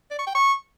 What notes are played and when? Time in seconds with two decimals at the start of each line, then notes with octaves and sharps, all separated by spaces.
0.11 D5
0.19 C#6
0.27 G5
0.35 C#6